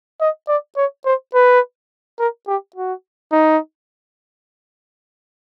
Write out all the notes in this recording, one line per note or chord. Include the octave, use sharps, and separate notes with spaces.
D#5
D5
C#5
C5
B4
A#4
G4
F#4
D#4